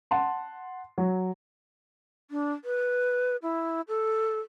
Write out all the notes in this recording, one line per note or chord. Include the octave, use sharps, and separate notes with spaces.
F#5 A5 C6
F#3
D4
B4
E4
A4